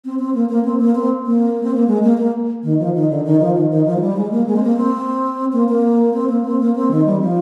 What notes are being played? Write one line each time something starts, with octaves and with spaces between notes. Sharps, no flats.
C4
C4
A#3
A#3
C4
A#3
C4
A#3
C4
A#3
G#3
A#3
A#3
D#3
F3
D#3
D3
D#3
F3
D#3
D#3
F3
G#3
G3
G#3
A#3
G#3
C4
A#3
C4
A#3
A#3
C4
A#3
C4
A#3
C4
D#3
G3
F3